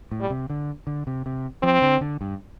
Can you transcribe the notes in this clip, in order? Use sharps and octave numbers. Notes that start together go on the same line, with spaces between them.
A2
G3
C3
D3
D3
C3
C3
F3 C4
D3
D3
G2